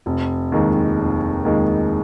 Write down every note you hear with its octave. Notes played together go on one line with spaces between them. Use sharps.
F1
D#2 D#3 G#3
F1
D#2 D#3 G#3